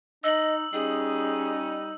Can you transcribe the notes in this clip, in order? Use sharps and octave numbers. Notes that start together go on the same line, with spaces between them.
D#4 D#5 E6 F#7
G3 C#4 D#4 G#4